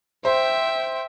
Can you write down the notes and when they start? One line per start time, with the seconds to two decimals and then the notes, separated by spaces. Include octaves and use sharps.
0.25 C5 E5 G5